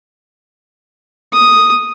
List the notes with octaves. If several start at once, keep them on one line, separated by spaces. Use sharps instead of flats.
D#6